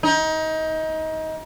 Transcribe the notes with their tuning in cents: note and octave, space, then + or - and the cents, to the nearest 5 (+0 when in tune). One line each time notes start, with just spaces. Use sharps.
D#4 +25